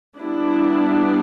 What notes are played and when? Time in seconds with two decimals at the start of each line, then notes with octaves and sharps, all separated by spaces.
0.20 G3 B3 D4 E4